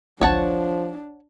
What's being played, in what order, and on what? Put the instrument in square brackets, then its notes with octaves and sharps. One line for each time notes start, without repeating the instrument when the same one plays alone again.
[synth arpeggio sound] A1 D2 [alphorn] F3 [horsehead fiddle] D4 [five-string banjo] C#5 F#5 A5